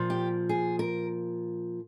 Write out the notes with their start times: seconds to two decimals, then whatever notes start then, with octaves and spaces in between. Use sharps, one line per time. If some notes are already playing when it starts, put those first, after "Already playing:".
Already playing: A#2 F3
0.10 G4
0.49 G#4
0.79 A#4